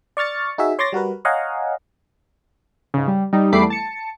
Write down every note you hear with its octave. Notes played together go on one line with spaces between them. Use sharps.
D5 C#6 F6 A6 C#7
D#4 F#4 G#4 E5
C#5 C6 D6 A6 A#6
G3 F#4 A#4 B4
C#5 D#5 F5 F#5 G#5 A#5
G#2 C#3
G3
G3 D#4
E2 G3 A3 B5 D6 C7
A5 C#7